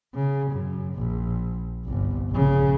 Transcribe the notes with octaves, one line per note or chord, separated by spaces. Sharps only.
C#3
F#2
A#1
G1 C2
A#1 C#3